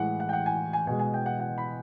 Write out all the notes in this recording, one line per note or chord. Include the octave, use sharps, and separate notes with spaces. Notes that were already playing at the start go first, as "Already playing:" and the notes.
Already playing: A2 E3 G#3 F#5
F#5
G5
F#5
G#5
G#5
B2 G#3 G#5
G#5
G5
F#5
F#5
B5